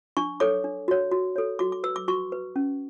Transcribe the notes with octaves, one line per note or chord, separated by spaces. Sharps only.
D4 C#6
A4 C#5 D6
D4
F#4 C#5
F#4
A4 C#5
F#4 D6
D6
B4 E6
D6
F#4 C#6
B4
C#4